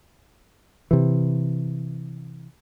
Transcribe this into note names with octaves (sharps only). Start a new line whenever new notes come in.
C3 E3